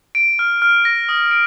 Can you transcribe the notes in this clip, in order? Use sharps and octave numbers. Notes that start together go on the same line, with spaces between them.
D7
F6
F6
A#6
D#6
D7